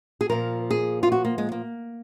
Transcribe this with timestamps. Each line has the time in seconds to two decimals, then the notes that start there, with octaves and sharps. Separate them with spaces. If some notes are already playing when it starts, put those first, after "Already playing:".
0.21 G#4
0.29 A#2 F3 A#4
0.71 G#4
1.03 F4
1.12 F#4
1.25 A#3
1.38 G#3
1.52 A#3